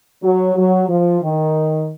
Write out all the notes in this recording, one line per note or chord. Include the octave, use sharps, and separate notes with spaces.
F#3
F#3
F3
D#3